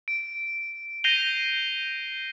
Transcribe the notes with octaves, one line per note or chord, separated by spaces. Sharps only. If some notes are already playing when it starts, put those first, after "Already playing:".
D7
G6 A#6 C7 D#7 F7 G7